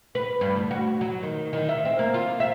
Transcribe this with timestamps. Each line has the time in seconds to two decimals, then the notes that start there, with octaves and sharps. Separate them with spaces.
0.15 B4
0.41 G2
0.56 D2
0.71 F#4
1.01 F#3
1.23 D#3
1.53 D#3
1.69 E5
1.85 C4
1.99 A#3
2.14 F4
2.40 E5